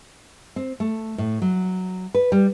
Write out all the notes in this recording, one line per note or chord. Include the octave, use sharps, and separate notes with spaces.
C4
A3
A2
F#3
B4
G3